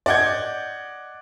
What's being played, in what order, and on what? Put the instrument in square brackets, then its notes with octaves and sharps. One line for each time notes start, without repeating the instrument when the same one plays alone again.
[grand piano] D5 D#5 F#5 G6 G#6